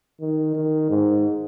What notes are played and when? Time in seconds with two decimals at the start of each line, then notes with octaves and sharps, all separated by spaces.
0.20 D#3
0.55 D#3
0.90 G#2